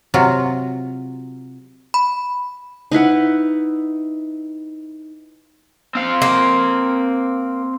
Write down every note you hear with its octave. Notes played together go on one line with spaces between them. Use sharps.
C3 F#3 F4
B5
D#4 E4 B4 F#5
C4 F5
A#3